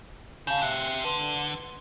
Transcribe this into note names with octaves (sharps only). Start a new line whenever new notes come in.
C#3 F5 A5 G6
G4 E5 F#6
D3 B4 C6